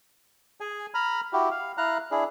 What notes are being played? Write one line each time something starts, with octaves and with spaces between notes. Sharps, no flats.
G#4 G#5
A#5 B5 F6
E4 F#4 G4
F5
E4 F5 A#5 F#6
D4 E4 G#4